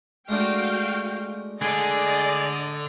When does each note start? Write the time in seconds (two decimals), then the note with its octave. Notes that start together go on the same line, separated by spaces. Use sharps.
0.29 G#3 A3 D4 F#4 F5 G5
1.62 D3 G#4 D5 D#5